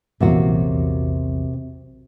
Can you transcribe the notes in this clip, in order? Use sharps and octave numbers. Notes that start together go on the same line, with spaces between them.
A#1 E2 C3 F#3 A#3 F#4